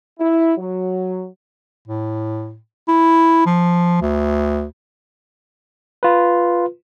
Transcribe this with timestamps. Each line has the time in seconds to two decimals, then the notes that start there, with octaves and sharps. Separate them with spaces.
0.20 E4
0.57 F#3
1.88 A2
2.88 E4
3.46 F3
4.01 D2
6.03 F4 B4